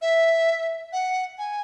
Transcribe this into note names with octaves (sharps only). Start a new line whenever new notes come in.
E5
F#5
G#5